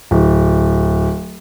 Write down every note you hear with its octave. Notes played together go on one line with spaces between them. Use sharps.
D1